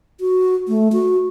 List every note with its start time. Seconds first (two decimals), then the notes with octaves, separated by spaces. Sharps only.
0.20 F#4
0.68 A3
0.93 F#4